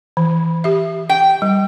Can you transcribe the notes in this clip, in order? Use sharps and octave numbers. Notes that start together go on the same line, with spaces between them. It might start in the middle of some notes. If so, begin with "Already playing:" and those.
E3
G4 E5
G5
G3